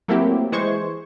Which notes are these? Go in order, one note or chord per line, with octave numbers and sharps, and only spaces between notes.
F#3 A3 A#3 C4 E4 G4
E3 G#3 C5 C#6 G#6